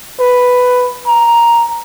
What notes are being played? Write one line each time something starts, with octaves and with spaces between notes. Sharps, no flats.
B4
A#5